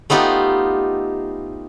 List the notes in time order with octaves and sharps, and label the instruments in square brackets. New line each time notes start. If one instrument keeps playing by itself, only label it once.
[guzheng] A3 B3 D#4 F4 G4